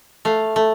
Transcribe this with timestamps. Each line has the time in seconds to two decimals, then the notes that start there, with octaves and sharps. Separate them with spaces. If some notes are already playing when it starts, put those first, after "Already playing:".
0.25 A3 F5
0.56 A3